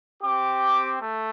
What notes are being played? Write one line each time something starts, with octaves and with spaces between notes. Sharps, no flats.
C4 G4 D6
A3